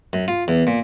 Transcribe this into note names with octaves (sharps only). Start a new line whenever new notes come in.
F#2
F4
E2
A#2